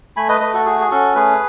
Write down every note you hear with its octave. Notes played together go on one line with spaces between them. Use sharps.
A3 G#5 B5
B4 D#5
A3 B4 D#5
F#4 A4
F#4 G#4
G#4
C#4 F#4 A4
A3 G#4 B4